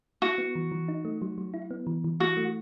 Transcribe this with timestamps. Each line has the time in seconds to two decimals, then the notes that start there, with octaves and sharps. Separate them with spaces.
0.22 E4 F#4
0.38 B3
0.55 E3
0.72 E3
0.88 D#4
1.05 A3
1.22 F#3
1.38 F#3
1.54 E4
1.71 B3
1.87 E3
2.04 E3
2.20 E4 F#4
2.37 A3